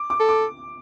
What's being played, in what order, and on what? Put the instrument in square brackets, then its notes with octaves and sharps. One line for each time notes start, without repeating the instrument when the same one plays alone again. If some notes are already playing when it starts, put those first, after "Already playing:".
Already playing: [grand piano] D6
D6
[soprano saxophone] A4
[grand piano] D6